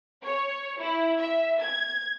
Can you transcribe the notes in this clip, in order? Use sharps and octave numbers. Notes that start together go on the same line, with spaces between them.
C#5
E4
E5
G#6